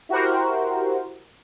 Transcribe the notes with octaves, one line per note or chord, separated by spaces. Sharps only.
E4 F#4 G4 A#4 C5